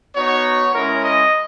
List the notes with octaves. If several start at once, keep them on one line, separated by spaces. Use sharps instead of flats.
B3 D#4 F#4 C#5
G#3 C#4 E4 A#4
D#5